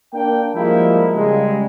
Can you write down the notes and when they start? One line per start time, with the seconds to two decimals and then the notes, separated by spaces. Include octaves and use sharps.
0.13 A#3 D4 G5
0.55 F3 G3 G#3 A#3 E4
1.14 C#3 G3 G#3